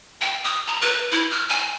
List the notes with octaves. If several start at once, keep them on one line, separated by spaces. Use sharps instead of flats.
G5
D#6
A#5
B4
E4
F6
G#5